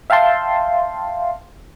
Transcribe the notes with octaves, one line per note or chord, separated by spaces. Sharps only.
E5 F5 G5 A5 C6